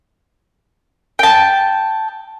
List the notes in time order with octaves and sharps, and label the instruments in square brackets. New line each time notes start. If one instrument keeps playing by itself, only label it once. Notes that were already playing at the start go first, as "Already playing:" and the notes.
[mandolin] G5 A5